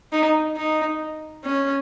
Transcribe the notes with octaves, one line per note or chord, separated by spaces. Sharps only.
D#4
D#4
C#4